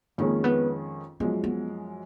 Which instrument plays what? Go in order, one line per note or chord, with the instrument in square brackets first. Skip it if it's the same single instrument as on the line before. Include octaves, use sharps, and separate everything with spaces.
[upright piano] F2 D#3 G#3 C#4 G#4 [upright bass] A#3
[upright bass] B3
[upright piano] F#2 F3 G#3 [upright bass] B3
[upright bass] B3